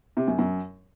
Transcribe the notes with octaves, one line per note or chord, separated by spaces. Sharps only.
C3
F#2
F#2